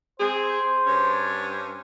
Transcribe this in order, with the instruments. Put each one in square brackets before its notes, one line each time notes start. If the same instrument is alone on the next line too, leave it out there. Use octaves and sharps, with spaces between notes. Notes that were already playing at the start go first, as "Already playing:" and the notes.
[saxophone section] C4 G#4 [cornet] C5
[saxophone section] G2 C#4